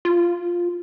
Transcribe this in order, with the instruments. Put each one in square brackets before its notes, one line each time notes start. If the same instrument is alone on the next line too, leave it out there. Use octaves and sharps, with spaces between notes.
[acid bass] F4